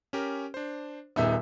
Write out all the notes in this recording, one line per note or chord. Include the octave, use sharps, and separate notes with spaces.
C#4 G4 A#4
D4 C5
D#1 B3 D#4 G#4 E5 E6